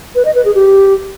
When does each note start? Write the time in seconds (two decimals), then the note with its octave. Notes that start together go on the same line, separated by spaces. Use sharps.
0.15 B4
0.25 D#5
0.35 B4
0.45 G#4
0.55 G4